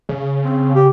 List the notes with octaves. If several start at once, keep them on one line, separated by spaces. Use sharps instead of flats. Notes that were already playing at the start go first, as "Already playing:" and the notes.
C#3
C4
G4